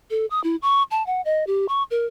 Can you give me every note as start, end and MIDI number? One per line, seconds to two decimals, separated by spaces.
0.10 0.26 69
0.31 0.42 87
0.44 0.56 64
0.62 0.83 85
0.91 1.05 81
1.07 1.21 78
1.25 1.46 75
1.47 1.66 67
1.69 1.83 85
1.91 2.06 70